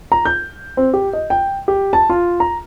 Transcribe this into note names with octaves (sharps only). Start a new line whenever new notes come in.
A#5
G6
C4
G4
D#5
G5
G4
A5
F4
A#5